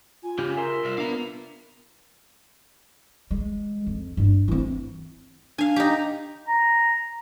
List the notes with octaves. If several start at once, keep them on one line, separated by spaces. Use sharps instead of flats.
F4 G#5
C#3 C#4 G4
A#4 E5 C6
C2
B3 D4 F5 A#5
G#3
F2
G2 D4
E3 C4
D4 F5 G#5
D#4 G4
A#5